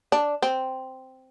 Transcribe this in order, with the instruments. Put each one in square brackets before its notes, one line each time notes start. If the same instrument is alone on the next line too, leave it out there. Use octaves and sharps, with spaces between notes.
[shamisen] D4
C4